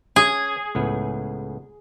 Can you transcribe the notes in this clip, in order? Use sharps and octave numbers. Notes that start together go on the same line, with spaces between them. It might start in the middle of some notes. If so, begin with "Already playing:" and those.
C#4 G#4
C#2 A2 B3